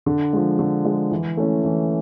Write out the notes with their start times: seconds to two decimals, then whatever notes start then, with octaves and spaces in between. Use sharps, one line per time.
0.06 D3
0.33 F3 G#3
0.59 D3
0.85 F3 G#3
1.12 E3
1.37 A3 C#4 E4
1.65 E3